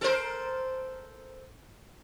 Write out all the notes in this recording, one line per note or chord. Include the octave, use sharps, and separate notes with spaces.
A4 A#4 C5